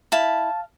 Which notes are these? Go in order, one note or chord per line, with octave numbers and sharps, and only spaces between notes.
E4 F5 A5